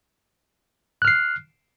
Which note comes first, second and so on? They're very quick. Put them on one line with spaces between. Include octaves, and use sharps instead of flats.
F#6 F6 C7